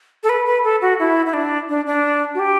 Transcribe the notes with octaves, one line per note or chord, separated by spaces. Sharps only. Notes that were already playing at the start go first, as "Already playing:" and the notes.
A4
B4
B4
A4
F#4
E4
E4
D4
D4
D4
F#4
G4